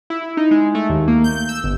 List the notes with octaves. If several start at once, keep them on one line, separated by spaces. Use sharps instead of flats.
E4
D#4
G#3
A3
D#2
A#3
G6
E6
G1